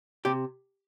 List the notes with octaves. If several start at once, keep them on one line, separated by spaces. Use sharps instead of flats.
C3 G4